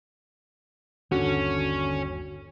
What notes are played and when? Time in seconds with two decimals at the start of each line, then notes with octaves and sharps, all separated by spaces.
1.12 G1 D#2 D3 C#4 F#4